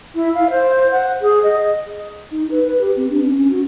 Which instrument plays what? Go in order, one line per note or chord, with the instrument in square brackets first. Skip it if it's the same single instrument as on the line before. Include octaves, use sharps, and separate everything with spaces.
[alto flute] E4
F5
C5
F#5
G#4
D#5
[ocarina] D#4
B4
B4
G4
C4
D4
C#4
C#4
F#4